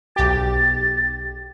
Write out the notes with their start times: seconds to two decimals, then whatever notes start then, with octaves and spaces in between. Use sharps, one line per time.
0.16 B1 G4 A6